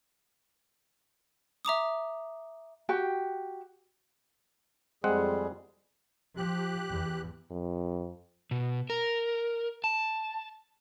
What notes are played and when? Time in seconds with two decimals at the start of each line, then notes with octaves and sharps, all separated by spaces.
1.65 E5 A#5 D6 D#6
2.89 F#4 G4 G5
5.04 F2 G3 G#3 C4 G#4 F#5
6.37 F3 G4 F#6
6.89 E2
7.51 F2
8.51 B2
8.90 A#4
9.84 A5